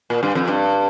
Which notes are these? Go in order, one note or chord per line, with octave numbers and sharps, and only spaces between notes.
A#2
G2
F2
G2